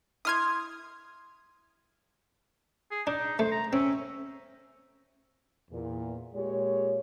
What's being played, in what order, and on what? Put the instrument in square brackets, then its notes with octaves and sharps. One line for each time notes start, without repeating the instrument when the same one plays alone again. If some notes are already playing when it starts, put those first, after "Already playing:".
[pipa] E4 C6 [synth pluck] D#6 F6 G#6
[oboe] G#4
[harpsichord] D4 [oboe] D#4
[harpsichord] A3 [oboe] C5
[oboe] A#5
[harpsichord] C4 [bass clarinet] C#4 [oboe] E5
[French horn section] E2 A#2
A#2 G#3 G4 C#5